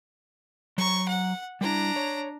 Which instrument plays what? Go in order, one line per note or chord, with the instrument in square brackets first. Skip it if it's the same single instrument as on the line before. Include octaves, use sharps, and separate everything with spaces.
[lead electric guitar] F#3 A#5 [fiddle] C#6
[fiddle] F#5
[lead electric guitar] G3 E4 [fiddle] D4 A#5
[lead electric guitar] C#5